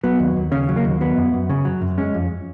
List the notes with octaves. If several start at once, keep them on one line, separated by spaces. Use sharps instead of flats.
F#3 B3
D#2
D#2
C#3 C#4
F#3
A#3
D#2
F#3 B3
F#2
F#2
C#3
F#3
F#2
G#3 C#4
F2